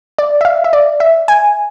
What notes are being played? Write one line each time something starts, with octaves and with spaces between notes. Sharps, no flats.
D5
E5
F5
E5
D5
E5
G#5